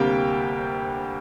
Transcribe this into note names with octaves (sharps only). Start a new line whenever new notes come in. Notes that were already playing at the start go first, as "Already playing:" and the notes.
Already playing: D2 C3 G3 A#3 G4 G5